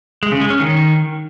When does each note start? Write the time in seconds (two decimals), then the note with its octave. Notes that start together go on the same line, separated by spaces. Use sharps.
0.23 G#3
0.32 C#3
0.41 G#3
0.50 C#4
0.59 D#3